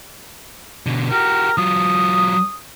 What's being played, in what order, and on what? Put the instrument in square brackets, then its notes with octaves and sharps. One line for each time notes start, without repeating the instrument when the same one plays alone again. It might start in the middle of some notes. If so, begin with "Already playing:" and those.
[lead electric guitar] B2 D3
[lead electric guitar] F#4 G4 [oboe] A#4
[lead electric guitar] F#3 F4 [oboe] D#6